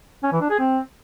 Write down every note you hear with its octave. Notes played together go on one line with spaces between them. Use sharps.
C#4
E3
D4
G#4
C4